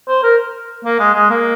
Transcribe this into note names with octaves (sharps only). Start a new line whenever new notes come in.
C5
A#4
A#3
G#3
G#3
A#3